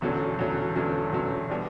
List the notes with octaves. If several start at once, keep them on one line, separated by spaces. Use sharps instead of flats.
E1 E2 D3 F#3 C#4
E1 E2 D3 F#3 C#4
E1 E2 D3 F#3 C#4
E1 E2 D3 F#3 C#4
B2 G3 D4